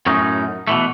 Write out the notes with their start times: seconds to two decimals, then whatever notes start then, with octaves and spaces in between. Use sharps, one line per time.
0.06 F#2 A2 C#4 D#4
0.67 B2 E3 A3